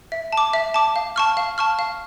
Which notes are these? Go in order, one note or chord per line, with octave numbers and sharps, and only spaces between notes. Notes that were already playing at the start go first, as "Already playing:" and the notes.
E5
A5 D6
E5
A5 D6
F5
A5 C#6 F6
F5
A5 C#6 F6
F5